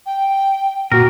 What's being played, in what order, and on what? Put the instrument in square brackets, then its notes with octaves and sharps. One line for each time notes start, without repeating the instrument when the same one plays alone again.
[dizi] G5
[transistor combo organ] A#2 [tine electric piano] F#4 F6 [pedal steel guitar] A#4